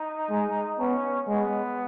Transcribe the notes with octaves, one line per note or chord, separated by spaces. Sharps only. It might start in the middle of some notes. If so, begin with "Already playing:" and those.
Already playing: D#4
G#3
B3 C#4
G#3 B3